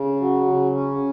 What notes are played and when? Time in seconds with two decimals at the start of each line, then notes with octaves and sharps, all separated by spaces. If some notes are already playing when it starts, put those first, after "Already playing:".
Already playing: C#3
0.20 F#3
0.47 C#3
0.74 C#4